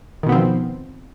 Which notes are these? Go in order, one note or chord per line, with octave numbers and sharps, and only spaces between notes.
B2 D#3 F3 B3 C4